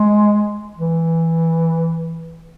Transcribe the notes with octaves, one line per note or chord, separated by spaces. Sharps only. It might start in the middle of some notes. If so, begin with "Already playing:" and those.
Already playing: G#3
E3